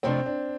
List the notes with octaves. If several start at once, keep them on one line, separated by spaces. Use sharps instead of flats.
F2 C3 F3 A3 C4 D4
D4